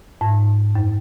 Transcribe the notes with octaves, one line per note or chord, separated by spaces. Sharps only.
G#2
F#2